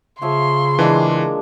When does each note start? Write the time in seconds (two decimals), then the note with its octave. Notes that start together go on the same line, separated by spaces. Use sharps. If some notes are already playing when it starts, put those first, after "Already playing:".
0.22 C#3 F3 C#5 E5 C6
0.79 E3 G#3 A#3 D4